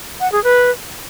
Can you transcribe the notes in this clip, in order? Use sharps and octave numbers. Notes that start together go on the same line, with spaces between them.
F#5
G#4
B4